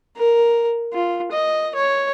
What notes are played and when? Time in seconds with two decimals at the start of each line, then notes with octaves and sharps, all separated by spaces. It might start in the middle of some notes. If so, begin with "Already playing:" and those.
0.16 A#4
0.93 F4
1.32 D#5
1.75 C#5